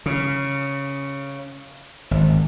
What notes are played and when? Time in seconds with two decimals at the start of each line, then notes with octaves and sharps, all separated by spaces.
0.06 C#3
2.11 G#1